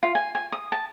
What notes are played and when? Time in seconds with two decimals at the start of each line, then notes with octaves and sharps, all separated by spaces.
0.03 F4
0.15 G#5
0.35 G#5
0.52 D#6
0.72 A5